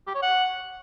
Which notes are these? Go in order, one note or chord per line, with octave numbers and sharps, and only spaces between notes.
G4
C#5
F#5